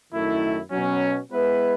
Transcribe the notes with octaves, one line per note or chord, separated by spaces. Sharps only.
F#2 D#3 A3 E4
B2 F#3 C#4
G#3 B3 E4 B4 E5